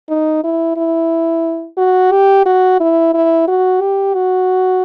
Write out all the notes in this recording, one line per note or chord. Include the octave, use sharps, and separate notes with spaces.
D#4
E4
E4
F#4
G4
F#4
E4
E4
F#4
G4
F#4